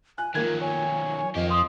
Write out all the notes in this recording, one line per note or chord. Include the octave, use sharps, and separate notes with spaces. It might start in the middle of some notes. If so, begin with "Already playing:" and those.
G#5 F#6
D#3 F3 F#3 A#3 A#4 G#6
C#5 G#5
F2 A#3 G4 D#5
F3 C6 D#6